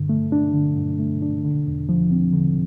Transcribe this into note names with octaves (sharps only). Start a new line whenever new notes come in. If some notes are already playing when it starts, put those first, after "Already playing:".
Already playing: G2 D3
A3
D4
D3
G2
A3
D4
D3
E2
F3
C4
D3